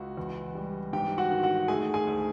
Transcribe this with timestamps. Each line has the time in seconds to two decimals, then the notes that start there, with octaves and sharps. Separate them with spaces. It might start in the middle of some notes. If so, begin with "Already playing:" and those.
Already playing: C#2 F#4
0.17 E2
0.55 G3
0.93 G#2 G4 G5
1.18 F#4 F#5
1.31 D#3
1.43 F#4 F#5
1.68 A3 G#4 G#5
1.94 G#4 G#5
2.07 D2